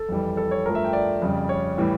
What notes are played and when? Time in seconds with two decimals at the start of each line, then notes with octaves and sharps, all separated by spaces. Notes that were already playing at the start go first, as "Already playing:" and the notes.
Already playing: A4
0.09 F2 E3 G3
0.37 A4
0.51 C#5
0.65 G2 F3 A3 A#4
0.75 E5
0.84 G5
0.93 D5
1.22 F2 C#3 G3
1.49 C#5
1.78 A2 E3 G3